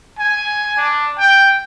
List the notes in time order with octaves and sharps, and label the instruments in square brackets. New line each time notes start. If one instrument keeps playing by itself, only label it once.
[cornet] G#5
D4
G5